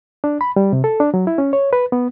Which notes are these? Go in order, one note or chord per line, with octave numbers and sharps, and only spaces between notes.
D4
B5
G3
C3
A4
D4
F#3
E4
C#4
C#5
B4
B3